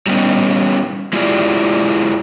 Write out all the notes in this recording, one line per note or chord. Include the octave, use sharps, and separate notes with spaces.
F#3 G3 B3 C#4 D#4
G#3 E4 F4 G4 G#4 D5